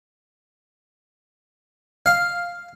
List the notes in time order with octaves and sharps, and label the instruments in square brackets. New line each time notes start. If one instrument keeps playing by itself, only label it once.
[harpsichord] F5